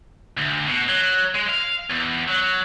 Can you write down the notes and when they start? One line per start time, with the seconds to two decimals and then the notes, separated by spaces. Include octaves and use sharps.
0.37 D2
0.67 B2
0.89 F#3
1.35 G#3
1.49 F5
1.90 E2
2.29 F#3